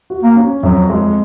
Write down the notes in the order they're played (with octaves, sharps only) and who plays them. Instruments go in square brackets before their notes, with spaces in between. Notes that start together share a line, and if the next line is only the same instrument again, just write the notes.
[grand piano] F#4
[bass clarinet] A#3
[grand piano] C#4
[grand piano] F2 [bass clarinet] F#3
[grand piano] G#3